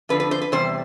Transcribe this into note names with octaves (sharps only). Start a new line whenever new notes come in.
F2 D3 F3 B4
B4
C5
B4
E2 C3 G3 C5